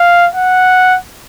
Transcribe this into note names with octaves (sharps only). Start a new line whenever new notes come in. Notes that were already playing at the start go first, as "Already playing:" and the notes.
Already playing: F5
F#5